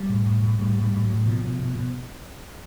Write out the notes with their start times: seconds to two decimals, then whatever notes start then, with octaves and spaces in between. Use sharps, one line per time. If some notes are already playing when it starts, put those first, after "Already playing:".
Already playing: G3
0.09 A2
0.26 A2
0.43 A2
0.59 A2 G3
0.76 A2
0.82 G3
0.92 A2
1.03 F#3
1.09 A2
1.26 B2 F3
1.42 B2
1.59 B2
1.75 B2